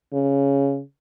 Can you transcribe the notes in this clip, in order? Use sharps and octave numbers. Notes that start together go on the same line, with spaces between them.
C#3